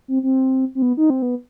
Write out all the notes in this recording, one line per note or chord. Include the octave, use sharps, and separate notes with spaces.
C4
C4
C4
B3
D#4
C4
B3